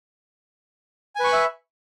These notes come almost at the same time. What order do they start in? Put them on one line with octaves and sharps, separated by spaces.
G#5 B4 C#6 B5 E5